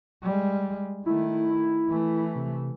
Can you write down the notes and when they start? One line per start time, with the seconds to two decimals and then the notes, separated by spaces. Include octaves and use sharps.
0.23 G3 G#3
1.06 D#3 A3 E4
1.88 E3 A3
2.35 C3